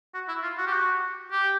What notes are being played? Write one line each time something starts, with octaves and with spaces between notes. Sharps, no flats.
F#4
E4
F4
F#4
G4
F#4
G4